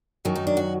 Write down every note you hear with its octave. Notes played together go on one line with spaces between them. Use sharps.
F#2 D#3 F#3
D#4
D4
F#4